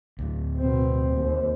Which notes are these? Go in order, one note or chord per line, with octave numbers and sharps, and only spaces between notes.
D2 A2
B2 C4 C5
D#2